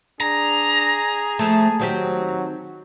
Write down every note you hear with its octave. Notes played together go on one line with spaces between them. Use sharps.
D4 G#4 A#5
F3 A3 A5
D#3 F#3 C4 G4